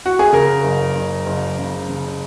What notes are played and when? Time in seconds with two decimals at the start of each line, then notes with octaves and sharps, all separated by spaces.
0.06 F#4
0.19 G#4
0.32 C#3 A#4
0.64 F#1
0.95 F#1
1.26 F#1
1.58 C#3
1.89 C#3